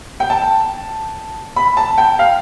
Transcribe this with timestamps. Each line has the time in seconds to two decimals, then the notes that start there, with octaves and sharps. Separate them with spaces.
0.20 G5
0.30 A5
1.56 B5
1.77 A5
1.98 G5
2.19 F5